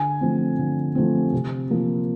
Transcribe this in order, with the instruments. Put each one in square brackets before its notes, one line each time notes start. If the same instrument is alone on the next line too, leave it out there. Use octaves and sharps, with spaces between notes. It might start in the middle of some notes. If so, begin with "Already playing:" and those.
Already playing: [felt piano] D3 G#5
F3 A3 C4
D3
F3 A3 C4
C3
F3 A#3